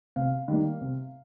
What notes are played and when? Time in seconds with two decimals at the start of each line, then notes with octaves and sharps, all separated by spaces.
0.16 C3 F5
0.48 D#3 G3 A#3
0.81 C3